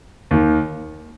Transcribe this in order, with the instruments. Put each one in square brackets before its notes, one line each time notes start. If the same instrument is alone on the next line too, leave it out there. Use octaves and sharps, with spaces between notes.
[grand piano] D#2 D#3